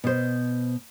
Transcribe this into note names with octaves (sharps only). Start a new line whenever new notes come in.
B2 C5